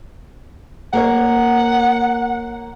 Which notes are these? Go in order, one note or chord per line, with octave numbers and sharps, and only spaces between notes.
A#3 A#4 C#5 F#5